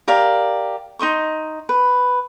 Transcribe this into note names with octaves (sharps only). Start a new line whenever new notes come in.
G4 A#4 D5 F5
D#4 D#5 C6 C#6
B4